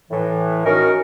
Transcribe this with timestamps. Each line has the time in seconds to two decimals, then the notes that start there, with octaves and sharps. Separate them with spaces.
0.11 A2 E3
0.65 C#4 D#4 F#4 A#4